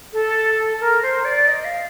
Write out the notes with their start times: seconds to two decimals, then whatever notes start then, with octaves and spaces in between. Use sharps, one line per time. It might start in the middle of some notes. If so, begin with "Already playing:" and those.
0.13 A4
0.81 A#4
1.03 C5
1.25 D5
1.48 D#5
1.65 F5